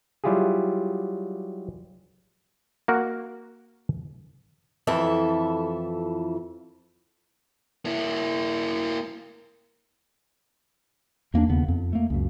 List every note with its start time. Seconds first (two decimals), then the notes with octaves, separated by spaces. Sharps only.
0.24 F#3 G3 E4 F4 G4 G#4
2.88 A#3 F#4 A#4
4.87 F2 E3 A4 E5
7.85 A#3 E4
11.34 E2 A#3 C4 D4
11.49 D#2 C#3 B3
11.68 F2
11.93 A3 A#3
12.10 C#2 F#2